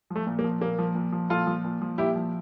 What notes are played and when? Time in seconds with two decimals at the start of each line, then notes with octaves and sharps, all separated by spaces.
0.10 F3
0.16 A3
0.27 A#2
0.39 A#3
0.44 F3
0.61 A#2 A#3
0.79 F3
0.95 A#2
1.12 F3
1.30 A#2 F4 A4
1.47 F3
1.64 A#2
1.81 F3
1.98 A#2 E4 G4
2.16 F3